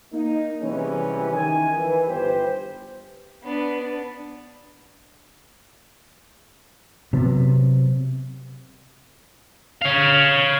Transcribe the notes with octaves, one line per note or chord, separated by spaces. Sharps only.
A#3 D#4
C3 E3 G3 G#3 B3 C#4
D#3 G#5
E3
G1 G4 B4 C5
B3 D4
C3 F#3 B3
C#5 F5